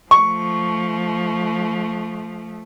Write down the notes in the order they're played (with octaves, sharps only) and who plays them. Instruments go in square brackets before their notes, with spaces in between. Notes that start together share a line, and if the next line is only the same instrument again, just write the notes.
[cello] F3 A3 [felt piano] C#6